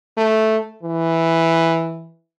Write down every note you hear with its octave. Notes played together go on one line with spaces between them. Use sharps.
A3
E3